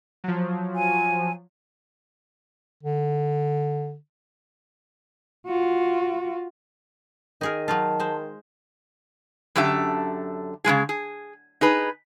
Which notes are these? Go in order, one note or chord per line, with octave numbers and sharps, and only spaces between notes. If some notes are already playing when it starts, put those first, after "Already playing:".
F3 F#3
G#5
D3
F4 F#4
D#3 D#4 G#4 A#4
F#3 D#4 F4 A5
G#3 C5
F#2 D3 G4 A4 E5
C#3 F3 G#3 G#4
G#4
D#4 G#4 B4